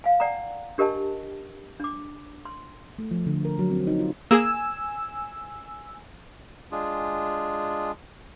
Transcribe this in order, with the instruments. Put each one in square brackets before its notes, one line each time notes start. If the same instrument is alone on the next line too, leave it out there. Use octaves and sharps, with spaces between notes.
[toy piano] F5 G#5
D5 F#5 G5 A#5
D4 G4 A#4 D#5 G#5 A5
D4 D6
C6
[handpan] A3
F3
D3
A#4
F#3
C4
D#4
F4
[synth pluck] A#3 G#4 [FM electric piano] G#5 E6
[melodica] G#3 D4 F4 G#4